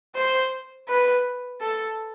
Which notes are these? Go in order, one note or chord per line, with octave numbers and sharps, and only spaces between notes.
C5
B4
A4